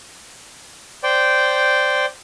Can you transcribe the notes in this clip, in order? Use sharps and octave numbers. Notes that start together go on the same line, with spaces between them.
C5 D5 G5